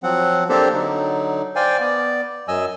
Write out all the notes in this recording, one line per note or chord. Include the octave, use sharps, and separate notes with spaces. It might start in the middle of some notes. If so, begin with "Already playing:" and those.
F3 F#3 C4 F#5
A#3 C4 D4 G4 A4 C5
D3 F#3 D#4
C5 D5 F5 G5 G#5
B3 D5
F#2 F#3 D#5 G#5 E6